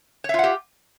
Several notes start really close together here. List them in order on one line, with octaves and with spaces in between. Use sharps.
C#5 E5 F4 F#5 G4